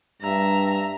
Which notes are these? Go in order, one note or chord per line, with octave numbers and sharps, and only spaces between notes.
G2 E5 A#5